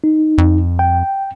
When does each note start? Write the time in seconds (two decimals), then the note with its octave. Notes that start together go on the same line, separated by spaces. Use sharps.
0.04 D#4
0.38 F2
0.79 G5